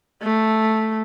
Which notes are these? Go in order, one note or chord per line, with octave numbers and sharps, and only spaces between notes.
A3